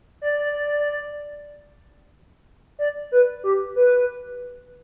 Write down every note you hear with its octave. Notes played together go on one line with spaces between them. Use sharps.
D5
D5
B4
G4
B4